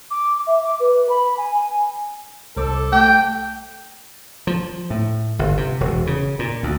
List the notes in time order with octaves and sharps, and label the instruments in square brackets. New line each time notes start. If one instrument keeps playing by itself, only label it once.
[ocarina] D6
E5
D6
B4
B5
G#5
G#5
[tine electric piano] C2 C5 D6 [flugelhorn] A4
[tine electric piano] A3 [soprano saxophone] G5
[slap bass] F3
A2
G1
C3
E1
C#3
A#2
D2